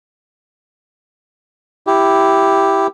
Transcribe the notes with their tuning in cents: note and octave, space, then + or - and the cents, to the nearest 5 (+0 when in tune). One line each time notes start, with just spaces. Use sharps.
E4 +0 G4 +0